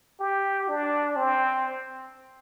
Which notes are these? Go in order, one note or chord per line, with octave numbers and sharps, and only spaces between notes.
G4
D4
C4